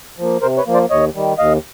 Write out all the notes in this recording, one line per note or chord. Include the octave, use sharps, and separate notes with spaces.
F3 A#3
C3 A#4 C5
B4 C#5
F3 A#3
C5 D5
D#2 C#5 D#5
D#3 G3
D#2 D#5 F5